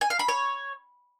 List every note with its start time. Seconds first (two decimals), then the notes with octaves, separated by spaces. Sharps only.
0.01 G#5
0.10 F5
0.19 B5
0.28 C#5